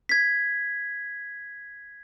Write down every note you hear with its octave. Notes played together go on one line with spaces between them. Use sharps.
G#6 B6